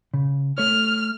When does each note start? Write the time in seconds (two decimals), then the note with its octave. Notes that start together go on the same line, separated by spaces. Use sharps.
0.14 C#3
0.58 A3 C#5 F6